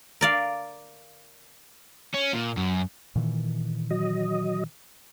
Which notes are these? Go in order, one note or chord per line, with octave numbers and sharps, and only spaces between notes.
A#4 D5 F5
C#4
A#2
F#2
A#2 D#3 E3
F#3 D#5